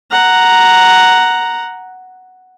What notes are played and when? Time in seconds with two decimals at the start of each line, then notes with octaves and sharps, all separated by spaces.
0.11 F#5 A#5